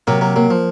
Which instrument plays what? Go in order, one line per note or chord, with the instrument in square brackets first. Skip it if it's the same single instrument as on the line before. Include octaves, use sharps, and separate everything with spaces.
[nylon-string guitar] C3 [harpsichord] F#3 A#3
[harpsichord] F#3 A#3
[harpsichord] F#3 [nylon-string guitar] A#3
[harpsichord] F3